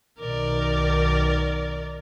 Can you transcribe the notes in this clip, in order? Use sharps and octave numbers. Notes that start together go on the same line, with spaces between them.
B1 B2 D#3 A#4 D5